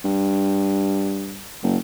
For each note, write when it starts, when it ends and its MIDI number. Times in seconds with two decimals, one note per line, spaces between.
0.05 1.44 43
1.63 1.77 30